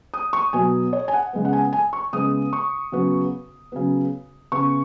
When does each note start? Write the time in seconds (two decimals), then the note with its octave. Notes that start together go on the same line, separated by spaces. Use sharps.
0.14 D#6
0.33 C#6
0.53 B2 F#3 B3 G#5
0.93 C#5
1.08 G#5
1.13 F#5
1.33 C#3 G#3 B3
1.45 F#5
1.53 G#5
1.73 G#5
1.93 C#6
2.13 C#3 G#3 B3 D#6
2.53 C#6
2.92 C#3 F#3 B3
3.72 C#3 F#3 B3
4.52 C#3 B3 C#6